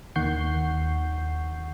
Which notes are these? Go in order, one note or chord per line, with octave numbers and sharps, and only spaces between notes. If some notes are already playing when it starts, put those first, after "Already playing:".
D#2 D#3 F#5 C#6 G6 C7